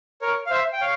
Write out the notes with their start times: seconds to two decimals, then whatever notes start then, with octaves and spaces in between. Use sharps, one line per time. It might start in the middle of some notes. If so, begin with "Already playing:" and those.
0.22 A#4 C#5
0.46 F5
0.50 C5 E5
0.73 G5
0.81 C#5 F5